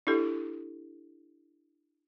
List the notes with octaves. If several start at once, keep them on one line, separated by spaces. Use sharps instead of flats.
D4 E4 G4 A4